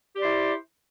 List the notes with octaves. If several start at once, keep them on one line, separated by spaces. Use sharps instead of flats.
E4 G4 C5 D5